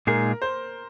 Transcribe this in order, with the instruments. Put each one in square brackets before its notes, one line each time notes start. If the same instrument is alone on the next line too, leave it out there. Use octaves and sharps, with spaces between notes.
[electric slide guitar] A#2 G#3 D#4 G#4 [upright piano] A#4
[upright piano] C5